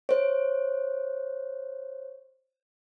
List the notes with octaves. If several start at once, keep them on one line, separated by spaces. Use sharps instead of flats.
C5 C#5